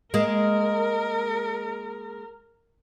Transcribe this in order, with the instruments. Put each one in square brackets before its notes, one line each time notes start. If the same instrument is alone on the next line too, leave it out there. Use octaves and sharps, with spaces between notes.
[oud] G#3 A#3 [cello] A#4